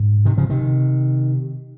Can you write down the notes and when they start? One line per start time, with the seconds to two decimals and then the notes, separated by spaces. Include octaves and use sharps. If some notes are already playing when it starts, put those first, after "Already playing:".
Already playing: G#2
0.25 C3 D#3
0.37 C#3 F3
0.49 C3 D#3